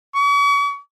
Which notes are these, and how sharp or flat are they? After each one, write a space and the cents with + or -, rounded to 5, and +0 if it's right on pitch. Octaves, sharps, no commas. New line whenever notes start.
C#6 +45